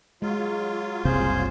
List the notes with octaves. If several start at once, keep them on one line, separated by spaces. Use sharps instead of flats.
F#3 G#3 F4
F#1 C2 C3 G#4 C5 G6